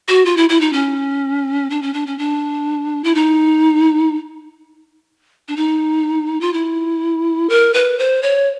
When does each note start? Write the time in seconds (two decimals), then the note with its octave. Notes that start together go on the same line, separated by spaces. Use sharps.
0.08 F#4
0.25 F4
0.37 E4
0.49 E4
0.61 D#4
0.73 C#4
1.70 D4
1.82 C#4
1.94 D4
2.07 C#4
2.19 D4
3.04 E4
3.15 D#4
5.48 D4
5.57 D#4
6.41 F4
6.54 E4
7.50 A#4
7.74 B4
7.99 C5
8.23 C#5